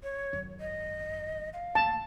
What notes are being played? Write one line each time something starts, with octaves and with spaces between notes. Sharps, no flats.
C#5
G#1 F#2
D#5
F5
A1 D2 A#3 A5